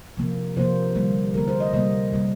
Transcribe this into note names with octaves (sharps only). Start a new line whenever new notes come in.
C3 F3 A#3
C3 F3 A#3 C5
D3 G3 A#3
D3 G3 A#3 A#4
C5
D#5
C3 G3 A#3 D#5
C3 G3 A#3